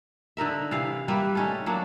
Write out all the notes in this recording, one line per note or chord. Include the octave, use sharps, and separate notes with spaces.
D3 D#4 A#4 E5
C3 E3 F5
G3 A#3 B4 E5
A3 C#4 D#4
F#3 A#3 D4